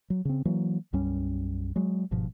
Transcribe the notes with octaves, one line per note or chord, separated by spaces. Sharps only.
F#3
C#3 C4
E3 F#3 A#3
B1 F#2 G3 C#4
F#3 G#3
G1 G#2 B2 F3